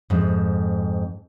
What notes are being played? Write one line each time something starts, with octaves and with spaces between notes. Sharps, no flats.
F2 G#2